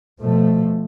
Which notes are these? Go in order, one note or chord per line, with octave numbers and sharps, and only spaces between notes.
B2 F3 A3